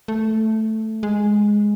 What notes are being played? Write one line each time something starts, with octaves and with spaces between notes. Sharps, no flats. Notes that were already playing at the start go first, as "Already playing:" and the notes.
A3
G#3